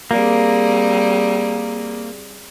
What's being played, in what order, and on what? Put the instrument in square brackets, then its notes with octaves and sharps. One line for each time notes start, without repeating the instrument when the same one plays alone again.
[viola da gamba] G3 C4 G#4 [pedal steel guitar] A#3